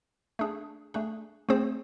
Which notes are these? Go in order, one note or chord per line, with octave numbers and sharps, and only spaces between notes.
A3 D4 G#4
A3 D4 G#4
A3 C4 G#4 C5